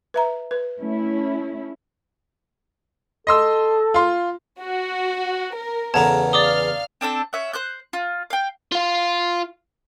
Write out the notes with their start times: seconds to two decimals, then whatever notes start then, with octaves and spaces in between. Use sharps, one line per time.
0.14 B4 E5 A#5
0.51 B4
0.81 A3 C#4 E4
3.27 A4 D#5 C6 E6
3.94 F4 C6
4.59 F#4
5.54 A#4
5.94 E2 C#3 B3 A4 F#5 A5 A#5 G#6
6.33 D5 F5 D6 D#6 F6 A6 G7
7.01 C4 D4 A4 E6
7.33 C#4 E5 F#5
7.53 C5 F#6 G6
7.93 F4
8.30 F5 G5
8.72 F4 F5